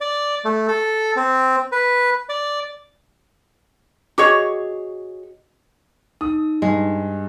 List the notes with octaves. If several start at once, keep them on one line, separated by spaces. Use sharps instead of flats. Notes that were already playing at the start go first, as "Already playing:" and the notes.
D5
A3
A4
C4
B4
D5
F#4 G#4 C#5 D#5 C#6 D6
D#4 D#6
G2 G#3